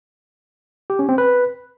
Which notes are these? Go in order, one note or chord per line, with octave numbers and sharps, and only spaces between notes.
G4
C#4
C4
B4